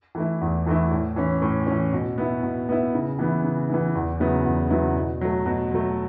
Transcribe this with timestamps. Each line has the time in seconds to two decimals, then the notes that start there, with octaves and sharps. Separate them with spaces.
0.15 E3 A3 E4
0.41 E2
0.67 E3 A3 E4
0.92 A2
1.16 E3 C#4
1.42 A2
1.67 E3 C#4
1.93 B2
2.18 B3 E4
2.43 B2
2.69 B3 E4
2.94 C#3
3.19 E3 B3 E4
3.44 C#3
3.69 E3 B3 E4
3.95 E2
4.20 C#3 F#3 B3 E4
4.45 E2
4.70 C#3 F#3 B3 E4
4.96 B2
5.21 F#3 A3
5.46 B2
5.72 F#3 A3